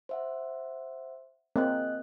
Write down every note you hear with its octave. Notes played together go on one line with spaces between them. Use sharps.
C5 E5 F#5
A#3 C4 G#4 D#5 F#6